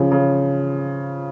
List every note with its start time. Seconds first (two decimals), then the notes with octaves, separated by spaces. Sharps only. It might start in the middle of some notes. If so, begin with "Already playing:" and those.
Already playing: C#3 F3
0.12 C#3